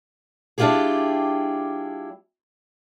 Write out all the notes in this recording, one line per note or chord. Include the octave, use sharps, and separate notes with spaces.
G3 D4 E4 F4 G4 G#4